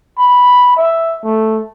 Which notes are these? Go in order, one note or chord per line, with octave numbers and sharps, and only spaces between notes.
B5
E5
A3